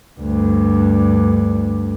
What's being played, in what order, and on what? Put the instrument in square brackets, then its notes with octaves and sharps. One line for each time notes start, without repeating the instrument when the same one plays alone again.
[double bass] D2 G2